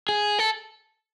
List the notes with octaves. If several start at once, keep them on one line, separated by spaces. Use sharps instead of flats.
G#4
A4